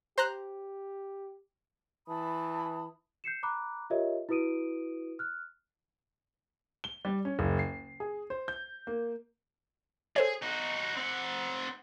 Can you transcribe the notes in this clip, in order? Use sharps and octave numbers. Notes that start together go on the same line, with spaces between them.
G4 C5 A#5 F#6
E3 A5 B5 D#6
G6 C7 C#7 E7
A#5 B5 D6 F#6
F4 G4 A#4 C#5 D#5 E5
E4 F#4 B4 D#6 D7 D#7
F6 F#6
G7
G3
C#4
F#1
C7
G#4
C5
G6
A#3
G#4 A4 C5 C#5
D#4 F#4
C4 F#5